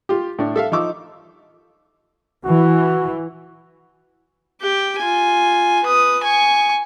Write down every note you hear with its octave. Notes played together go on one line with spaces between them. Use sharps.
F4 G4
A2 D4
A4 E5 F5
F3 D#4 C#6 D6 E6
E3 F#4
G4 G5
F4 G#5
B4 D#6
G#5 C#6